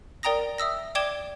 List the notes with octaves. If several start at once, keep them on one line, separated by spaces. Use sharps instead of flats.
A#4 D5 G5 A#5 D#6 A#6
E5 D#6 E6 A#6
D5 G5 D6 G#6 E7 G7